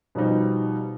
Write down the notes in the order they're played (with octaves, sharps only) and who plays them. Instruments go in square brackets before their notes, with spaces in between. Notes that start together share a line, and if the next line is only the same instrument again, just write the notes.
[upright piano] B2 F3 G3 D#4